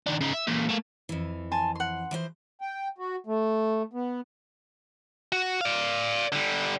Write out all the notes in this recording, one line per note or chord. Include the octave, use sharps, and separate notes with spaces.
D#3 D4
C#3 D#4
E5
A#2 E3
A3 A#3
F2 E3
G#5 A5 C6
F#5 C6
E3 F3 C5
G5
F#4
A3
B3
F#4
D5 F5
D3 G3